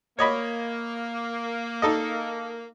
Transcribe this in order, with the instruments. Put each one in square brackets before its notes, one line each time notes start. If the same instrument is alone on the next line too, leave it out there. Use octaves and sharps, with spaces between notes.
[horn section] A#3 [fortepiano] C#5 D#5 B5
[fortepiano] D#4 A4 D#5